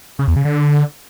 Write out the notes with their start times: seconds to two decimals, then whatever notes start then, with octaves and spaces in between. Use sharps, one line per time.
0.19 C#3
0.28 E2
0.36 C#3
0.45 D3